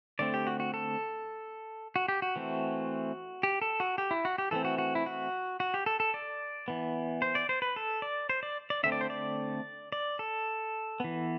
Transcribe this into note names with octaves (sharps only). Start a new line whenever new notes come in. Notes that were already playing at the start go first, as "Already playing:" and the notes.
D3 A3 C4 D5
G4
F#4
F#4
A4
F#4
G4
F#4
E3 A3 C4
G4
A4
F#4
G4
E4
F#4
G4
E3 A3 C4 A4
F#4
F#4
E4
F#4
F#4
G4
A4
A4
D5
E3 B3
C5
D5
C5
B4
A4
D5
C5
D5
D5
D3 A3 C4 E5
D5
C5
D5
D5
A4
E3 B3